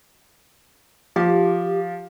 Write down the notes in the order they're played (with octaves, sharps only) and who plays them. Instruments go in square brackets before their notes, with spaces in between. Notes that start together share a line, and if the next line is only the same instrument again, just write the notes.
[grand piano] F3 [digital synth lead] G4